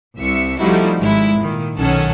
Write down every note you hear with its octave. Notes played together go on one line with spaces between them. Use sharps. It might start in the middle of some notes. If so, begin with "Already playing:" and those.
C2 E5 C#7
F3 G3 A3 D#4 E4 F#4
G#1 G#3 E4
A#2 D#3
B1 D#3 C#4 A4 F#5